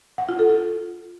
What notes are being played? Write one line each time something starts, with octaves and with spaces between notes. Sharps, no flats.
F#5
F4
A4
F4